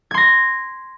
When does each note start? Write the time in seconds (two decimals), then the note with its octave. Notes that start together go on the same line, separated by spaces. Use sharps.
0.11 G#6
0.14 C6
0.18 A#6